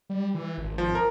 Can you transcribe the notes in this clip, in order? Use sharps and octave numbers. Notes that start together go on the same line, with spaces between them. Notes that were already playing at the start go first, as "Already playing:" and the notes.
G3
E3
G#1
F3
A#4